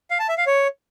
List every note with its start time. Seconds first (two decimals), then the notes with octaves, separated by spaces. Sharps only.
0.10 F5
0.19 A5
0.29 E5
0.38 F5
0.47 C#5